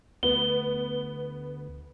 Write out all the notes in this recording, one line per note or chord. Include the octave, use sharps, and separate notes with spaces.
D2 B3 G7